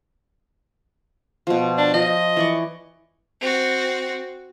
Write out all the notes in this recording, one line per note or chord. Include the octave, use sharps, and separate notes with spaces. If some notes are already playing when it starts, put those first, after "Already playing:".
B2 F3
D4
F3 D#5
E3 D5 C#6
C4 F#4